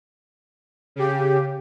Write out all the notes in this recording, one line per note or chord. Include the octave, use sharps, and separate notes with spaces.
C#3 G4